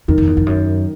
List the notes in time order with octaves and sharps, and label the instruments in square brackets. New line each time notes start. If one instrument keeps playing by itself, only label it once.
[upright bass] E2 [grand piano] D#3
[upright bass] F2
E2
F2
F#2